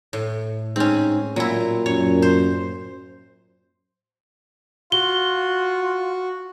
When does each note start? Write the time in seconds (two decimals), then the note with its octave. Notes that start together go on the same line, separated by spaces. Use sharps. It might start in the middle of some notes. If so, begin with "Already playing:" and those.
0.13 A2
0.76 G#2 C4 C#4
1.36 A#2 F#3 E4
1.86 F#2 C#5
2.22 C5
4.92 F4 F#4 G7